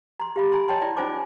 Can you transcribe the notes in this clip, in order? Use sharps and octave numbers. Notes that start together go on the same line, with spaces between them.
A#5 C6
G4 F5 B5
G#5 A#5 C6
C#5 D#5 G5 A5 C6
E4 D5 G5
C#4 D#4 F4 C5 G#5 D6